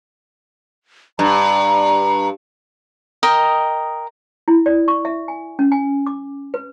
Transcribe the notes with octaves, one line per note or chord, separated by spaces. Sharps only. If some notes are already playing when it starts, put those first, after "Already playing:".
G2 A#5
A#4 D#5 G5 D#6
E4
D5
C#6
E5
G#5
C#4
G#5
D6
B4